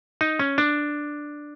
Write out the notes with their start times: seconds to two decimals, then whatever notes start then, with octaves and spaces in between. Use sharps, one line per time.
0.21 D#4
0.39 C#4
0.58 D4